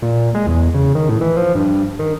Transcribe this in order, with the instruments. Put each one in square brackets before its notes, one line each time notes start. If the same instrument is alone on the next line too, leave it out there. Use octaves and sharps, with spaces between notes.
[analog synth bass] A#2
G#3
E2
C#3
D#3
A2
E3
F3
G2
D#3